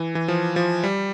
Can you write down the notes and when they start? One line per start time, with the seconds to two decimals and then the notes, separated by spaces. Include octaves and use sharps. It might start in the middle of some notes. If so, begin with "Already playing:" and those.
Already playing: E3
0.15 E3
0.28 F3
0.56 F3
0.83 G3